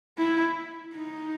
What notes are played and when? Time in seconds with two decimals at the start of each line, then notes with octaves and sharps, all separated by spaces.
0.18 E4
0.95 D#4